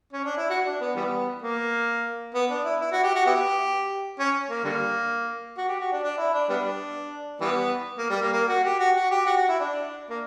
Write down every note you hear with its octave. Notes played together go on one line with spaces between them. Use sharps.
C#4
D4
E4
F#4
D4
B3
E3 G3 B3
A#3
B3
D4
E4
E4
F#4
G4
F#4
B3 E4 G4
C#4
A#3
D3 G3 A#3
F#4
G4
F#4
D4
D4
E4
D4
G3 B3 D4
E3 G3 B3
A#3
G3
A#3
A#3
F#4
G4
F#4
F#4
G4
F#4
F#4
E4
D4
A#3